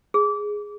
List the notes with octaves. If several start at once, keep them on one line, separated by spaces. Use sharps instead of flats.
G#4